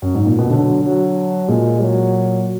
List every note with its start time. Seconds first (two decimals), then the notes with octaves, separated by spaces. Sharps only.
0.02 F#2
0.15 G#2
0.26 A#2
0.39 B2
0.50 D3 F#3
0.83 F#3
1.48 A#2 G#3
1.81 F#3